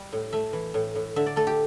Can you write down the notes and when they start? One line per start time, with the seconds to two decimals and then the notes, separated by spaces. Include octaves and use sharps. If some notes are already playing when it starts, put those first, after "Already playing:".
Already playing: G3
0.13 A2
0.33 A3 E5
0.53 E3
0.74 A2
0.95 A2
1.16 D3 E5
1.26 D5
1.36 A3 A4
1.47 G4